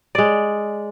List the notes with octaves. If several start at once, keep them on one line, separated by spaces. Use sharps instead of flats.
G#3 D5